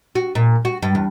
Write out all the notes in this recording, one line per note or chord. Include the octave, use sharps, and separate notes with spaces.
F#4
A#2
F#4
G2
E2